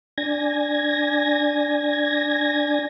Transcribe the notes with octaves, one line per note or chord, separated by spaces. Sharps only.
D4 G#5 G#6 A#6